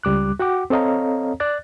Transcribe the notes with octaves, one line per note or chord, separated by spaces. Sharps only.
C#2 G3 D6 F#6
F#4 F#5 G5 D6
C4 A4 C#5 D#5 F5 A#5
D5 F#6 A6